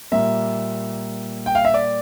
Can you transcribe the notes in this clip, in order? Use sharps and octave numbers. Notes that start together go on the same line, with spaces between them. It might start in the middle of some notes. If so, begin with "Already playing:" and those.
A#2 G3 A#3 E5
G5
F5
E5
D5